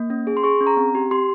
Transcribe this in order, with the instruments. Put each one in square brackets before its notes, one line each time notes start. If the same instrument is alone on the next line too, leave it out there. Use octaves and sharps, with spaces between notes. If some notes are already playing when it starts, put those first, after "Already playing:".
Already playing: [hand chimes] A#3
C#4
G#4
C6
G#4 C#6
C#4
A#5
C4
G4
G4 C6